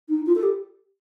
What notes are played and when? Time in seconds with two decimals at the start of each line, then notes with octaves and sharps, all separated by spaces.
0.09 D#4
0.26 F4
0.35 A4
0.42 G4